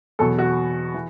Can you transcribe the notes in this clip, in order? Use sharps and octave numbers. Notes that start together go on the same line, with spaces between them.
E2 B2 F#3 A4
F#4
E3